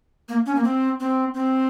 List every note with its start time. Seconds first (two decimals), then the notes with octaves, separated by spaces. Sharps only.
0.29 A#3
0.46 C#4
0.55 A#3
0.64 C4
1.00 C4
1.34 C4